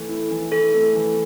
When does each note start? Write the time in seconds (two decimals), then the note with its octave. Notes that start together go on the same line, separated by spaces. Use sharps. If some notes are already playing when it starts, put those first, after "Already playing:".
Already playing: E3 A3 A4
0.09 E4
0.31 E3
0.52 E4 A4
0.74 A3
0.95 E3